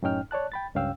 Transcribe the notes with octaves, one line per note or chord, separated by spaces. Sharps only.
F#2 A2 C#4 D#4 G5 F6
C#5 D5 A5 F#6
G5 B5 A6
C#2 G2 C#4 F5 G5 E6